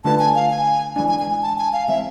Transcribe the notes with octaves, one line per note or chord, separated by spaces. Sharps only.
D3 A3 D4 F4 B4 A5
G#5
F5
G#5
E3 G#3 D4 G#5
G#5
G#5
G#5
A5
G#5
F5
E3 G#3 C4 E5